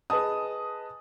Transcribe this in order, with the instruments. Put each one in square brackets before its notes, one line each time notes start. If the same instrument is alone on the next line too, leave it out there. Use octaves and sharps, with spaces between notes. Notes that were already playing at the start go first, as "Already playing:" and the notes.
[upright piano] G#4 B4 D#5 A5 D#6